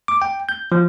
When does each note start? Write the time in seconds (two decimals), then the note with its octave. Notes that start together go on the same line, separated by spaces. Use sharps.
0.08 D6
0.22 G5
0.49 G6
0.72 F3